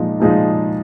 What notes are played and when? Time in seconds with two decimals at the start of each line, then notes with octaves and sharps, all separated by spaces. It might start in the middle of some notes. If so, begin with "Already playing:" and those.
Already playing: A#2 F3 G#3 D#4
0.20 A#2 F3 G#3 D#4